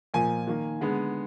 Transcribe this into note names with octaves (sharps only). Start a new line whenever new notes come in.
A#2 F3 A#3 G#5
D#3 A#3
D3 G#3 B3